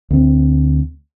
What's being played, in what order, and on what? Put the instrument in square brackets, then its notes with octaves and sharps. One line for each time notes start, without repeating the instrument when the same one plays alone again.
[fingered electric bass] D2 C4